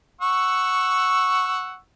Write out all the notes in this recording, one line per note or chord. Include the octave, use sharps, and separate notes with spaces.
F#5 C#6 E6